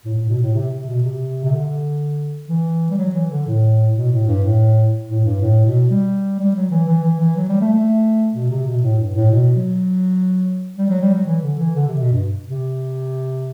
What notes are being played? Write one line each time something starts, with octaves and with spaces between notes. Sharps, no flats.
A2
A2
B2
A2
C3
C3
B2
C3
C3
D3
E3
G3
F#3
E3
D3
A2
B2
A2
G2
A2
A2
G2
A2
B2
G3
G3
F#3
E3
E3
E3
E3
F#3
G3
A3
A3
B2
C3
B2
A2
G2
A2
B2
F#3
G3
F#3
G3
F#3
E3
D3
E3
D3
C3
B2
G2
C3